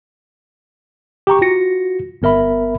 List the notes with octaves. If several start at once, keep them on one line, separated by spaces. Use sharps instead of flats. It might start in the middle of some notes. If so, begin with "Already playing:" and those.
G4 G5 A#5 C#6
F4 F#4 A#6 C#7
G1 B3 A#4 E5 B5